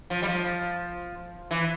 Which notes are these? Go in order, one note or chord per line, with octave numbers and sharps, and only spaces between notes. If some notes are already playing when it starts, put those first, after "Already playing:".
F3
G3
F3
E3